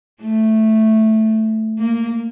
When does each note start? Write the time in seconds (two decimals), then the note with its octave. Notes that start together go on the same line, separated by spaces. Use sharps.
0.22 A3
1.78 A#3